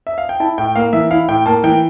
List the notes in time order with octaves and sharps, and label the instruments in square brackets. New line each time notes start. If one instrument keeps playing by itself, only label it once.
[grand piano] E5
F5
G5
E4 A5
A2 G5
A#3 F5
E3 E5
E4 F5
A2 G5
A#3 A5
E3 G5